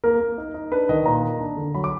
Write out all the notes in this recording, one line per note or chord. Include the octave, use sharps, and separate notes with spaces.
A#3 A#4
A#3
D#4
D#4
D4 B4
D#3 D#5
A#2 A#5
A#3
D4
D3
F#3 B5
D6